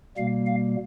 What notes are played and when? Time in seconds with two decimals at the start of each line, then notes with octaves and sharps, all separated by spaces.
0.17 B2 G3 A#3 F5
0.46 F5